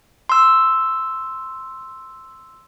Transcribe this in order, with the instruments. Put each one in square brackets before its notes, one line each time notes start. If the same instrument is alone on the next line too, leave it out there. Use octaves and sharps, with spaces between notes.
[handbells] C6 E6